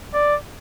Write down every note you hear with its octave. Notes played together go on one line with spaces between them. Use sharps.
D5